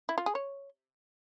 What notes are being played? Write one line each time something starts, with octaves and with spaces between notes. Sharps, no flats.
E4
F4
G#4
C#5